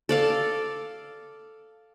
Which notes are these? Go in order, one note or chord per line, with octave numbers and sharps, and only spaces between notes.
A4 D5 F5